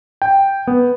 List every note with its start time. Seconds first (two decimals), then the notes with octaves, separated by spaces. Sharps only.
0.22 G5
0.67 B3